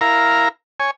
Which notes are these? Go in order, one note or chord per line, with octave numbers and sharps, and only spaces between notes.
E4 A#4 F5 A#5
C#5 G#5